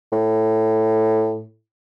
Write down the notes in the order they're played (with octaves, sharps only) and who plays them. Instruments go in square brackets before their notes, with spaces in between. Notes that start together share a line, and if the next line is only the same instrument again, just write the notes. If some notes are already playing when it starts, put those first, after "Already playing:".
[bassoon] A2